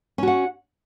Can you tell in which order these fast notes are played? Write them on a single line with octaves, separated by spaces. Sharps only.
C#4 F#4 F#5